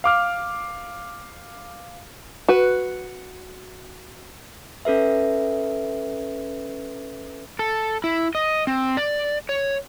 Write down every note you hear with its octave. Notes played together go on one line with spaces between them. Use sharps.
F5 D6 F6
F#4 B4
C#4 A4 B4 E5
A4
E4
D#5
C4
D5
C#5